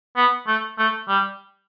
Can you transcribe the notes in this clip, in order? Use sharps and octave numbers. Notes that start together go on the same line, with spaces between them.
B3
A3
A3
G3